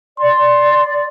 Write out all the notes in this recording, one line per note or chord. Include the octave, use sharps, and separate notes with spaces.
D5 C6